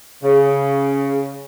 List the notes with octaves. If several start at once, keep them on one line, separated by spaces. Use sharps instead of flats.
C#3